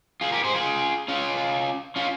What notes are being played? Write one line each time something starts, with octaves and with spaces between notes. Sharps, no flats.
F4 G#4
G4 A#4
G#4 C5
F4 G#4
C#4 F4
C#4 F4